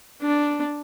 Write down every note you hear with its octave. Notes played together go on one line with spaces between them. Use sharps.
D4